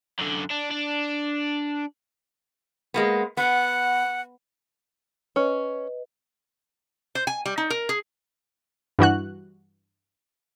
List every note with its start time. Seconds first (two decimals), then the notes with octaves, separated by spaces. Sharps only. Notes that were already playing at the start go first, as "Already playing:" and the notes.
0.19 F#2 D3
0.50 D4
0.71 D4
2.94 G#3 A#3 B3
3.37 B3 F#5
5.36 C#4 B4 D#5
7.15 C5
7.27 G#5
7.46 G3
7.58 D#4
7.70 A#4
7.89 G#4
8.99 G2 E3 F#4 F#6